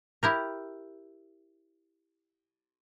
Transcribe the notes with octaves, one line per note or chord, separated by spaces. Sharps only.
E4 G4 A#4